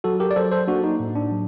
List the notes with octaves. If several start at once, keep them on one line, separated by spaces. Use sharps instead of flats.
F#3 F#4 A4
G4 A#4
D5
F#3 A4 C5
A4 C5
A#3 D4 F#4
D#4
A2
D4
F#3